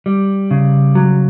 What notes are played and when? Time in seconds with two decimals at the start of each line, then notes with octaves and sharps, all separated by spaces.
0.06 G3
0.51 C#3
0.95 F#3